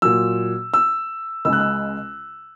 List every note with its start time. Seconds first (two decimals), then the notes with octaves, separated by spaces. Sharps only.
0.02 A#2 F#3 E6
0.74 E6
1.45 C#2 C#3 G#3 E6
1.53 F#6
1.60 E6